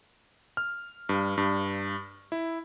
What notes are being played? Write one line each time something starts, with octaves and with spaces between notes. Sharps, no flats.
F6
G2
G2
E4